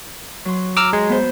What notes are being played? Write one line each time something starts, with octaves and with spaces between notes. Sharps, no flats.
F#3 C6
A#5 D6 E6 F6
G#3
B3 C5